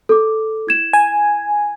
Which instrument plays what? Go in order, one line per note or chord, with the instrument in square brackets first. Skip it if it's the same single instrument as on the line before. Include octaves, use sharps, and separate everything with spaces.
[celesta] A4 D6
E4 G#6 E7
[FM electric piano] G#5